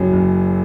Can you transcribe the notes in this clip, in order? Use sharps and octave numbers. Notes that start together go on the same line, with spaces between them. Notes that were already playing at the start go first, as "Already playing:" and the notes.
Already playing: F#1 F#2 F#3
F#1